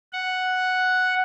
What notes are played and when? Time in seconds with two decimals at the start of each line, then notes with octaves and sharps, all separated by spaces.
0.13 F#5